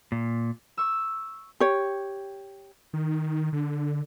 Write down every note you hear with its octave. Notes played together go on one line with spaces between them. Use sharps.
A#2
C#6 E6
G4 C#5
D#3
D3